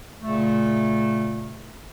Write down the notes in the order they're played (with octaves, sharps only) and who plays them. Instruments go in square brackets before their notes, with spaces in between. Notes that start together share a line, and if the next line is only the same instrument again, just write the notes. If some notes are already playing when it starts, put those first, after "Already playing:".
[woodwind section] A#2 C#3 A3